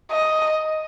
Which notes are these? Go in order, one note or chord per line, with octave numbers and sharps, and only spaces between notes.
D#5